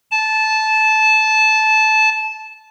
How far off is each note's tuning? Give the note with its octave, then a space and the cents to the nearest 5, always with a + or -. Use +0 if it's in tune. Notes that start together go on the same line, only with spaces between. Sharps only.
A5 -15